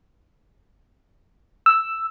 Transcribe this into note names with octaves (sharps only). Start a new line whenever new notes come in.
E6